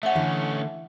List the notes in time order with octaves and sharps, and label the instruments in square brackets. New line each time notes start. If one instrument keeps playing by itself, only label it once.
[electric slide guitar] A3 C#4 [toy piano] E5 F#5
[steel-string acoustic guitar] D3 [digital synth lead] E3